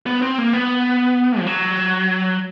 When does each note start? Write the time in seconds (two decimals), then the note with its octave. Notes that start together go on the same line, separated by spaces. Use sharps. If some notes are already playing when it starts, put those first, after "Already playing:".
0.06 B3
0.22 C4
0.38 A#3
0.53 B3
1.39 F3
1.47 F#3